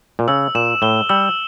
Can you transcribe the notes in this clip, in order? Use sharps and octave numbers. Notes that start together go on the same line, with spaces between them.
A#2
C#3 E6
A#2 E7
A2 G7
G3 E6